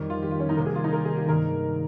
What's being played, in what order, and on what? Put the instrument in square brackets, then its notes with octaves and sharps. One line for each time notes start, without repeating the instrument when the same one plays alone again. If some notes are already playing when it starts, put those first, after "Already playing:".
Already playing: [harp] F2 D#3 G3
[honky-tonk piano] F4
G4
F4
C#4
D#4
[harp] C2 C3 D#3 A#3 [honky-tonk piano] A#4
[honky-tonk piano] G#4
F4
D#4
A#4
G#4
G4
[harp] G2 D#3 G#3 C4 F4 [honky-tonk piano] A#4